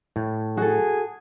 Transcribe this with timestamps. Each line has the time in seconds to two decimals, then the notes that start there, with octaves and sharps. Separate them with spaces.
0.16 A2
0.57 F#4 G#4 A4